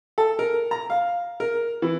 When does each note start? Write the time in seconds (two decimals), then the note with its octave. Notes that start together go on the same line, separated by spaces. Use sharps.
0.18 A4
0.39 A#4
0.71 A#5
0.90 F5
1.40 A#4
1.82 E3